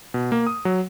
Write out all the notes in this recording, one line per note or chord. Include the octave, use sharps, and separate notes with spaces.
B2
A#3
D#6
F#3